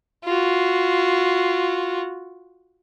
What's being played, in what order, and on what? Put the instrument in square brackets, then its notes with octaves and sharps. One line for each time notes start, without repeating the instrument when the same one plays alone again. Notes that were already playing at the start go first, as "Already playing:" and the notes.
[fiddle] F4 F#4